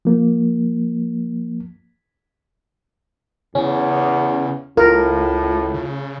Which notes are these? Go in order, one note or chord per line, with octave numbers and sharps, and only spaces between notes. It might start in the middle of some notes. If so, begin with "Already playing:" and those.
F3 A#3
E2 C#3 C#4
C#2 A2 F4 A#4
C#3